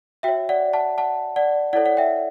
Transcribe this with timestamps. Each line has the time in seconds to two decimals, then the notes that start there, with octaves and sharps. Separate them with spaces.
0.23 F#4 C#5 E5 G5
0.49 D5 F#5
0.73 F#5 A5
0.98 F#5 A5
1.36 D5 F#5
1.73 E4 A4 C#5 D5 F#5
1.86 F#5
1.97 E5 G5